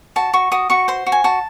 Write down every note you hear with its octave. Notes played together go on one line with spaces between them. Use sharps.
F#4 A5
F#4 C#6
F#4 D#6
F#4 C#6
C5 C6
F#4
G#5
F#4 A5